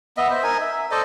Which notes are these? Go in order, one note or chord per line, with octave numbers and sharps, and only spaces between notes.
B3 D#5 E5
C5 E5
D#4 A#4 G#5
E5
E5
A4 C5 D5 D#5